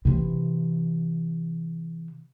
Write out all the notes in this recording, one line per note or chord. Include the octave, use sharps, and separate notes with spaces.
C3 E3